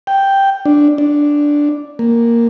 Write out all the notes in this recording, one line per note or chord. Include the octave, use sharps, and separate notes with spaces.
G5
D4
D4
A#3